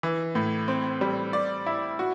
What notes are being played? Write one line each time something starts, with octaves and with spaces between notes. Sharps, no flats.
E3
A2
C4
G3
D5
E4
F#4